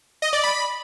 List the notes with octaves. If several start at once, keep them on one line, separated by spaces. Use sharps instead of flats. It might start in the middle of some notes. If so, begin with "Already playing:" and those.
D#5
D5
B5